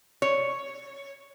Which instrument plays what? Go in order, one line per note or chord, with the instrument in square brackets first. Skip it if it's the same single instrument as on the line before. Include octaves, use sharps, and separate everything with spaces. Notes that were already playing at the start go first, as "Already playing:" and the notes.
[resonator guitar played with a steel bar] C#5